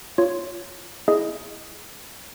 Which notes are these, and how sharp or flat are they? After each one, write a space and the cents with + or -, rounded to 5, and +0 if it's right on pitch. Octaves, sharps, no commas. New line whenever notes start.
F4 +0 C#5 +0
E4 +0 G#4 +0 D#5 +0